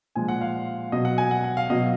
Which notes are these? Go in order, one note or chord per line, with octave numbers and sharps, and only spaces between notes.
A#2 F3 G#3 G#5
F#5
F5
B2 F#3 D#5
F#5
G#5
F#5
F#5
F5
B2 F#3 D#5